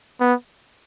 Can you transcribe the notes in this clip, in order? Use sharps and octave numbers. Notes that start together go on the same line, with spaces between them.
B3